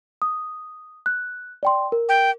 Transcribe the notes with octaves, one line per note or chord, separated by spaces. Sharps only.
D#6
F#6
D5 G5 C6
A#4
G5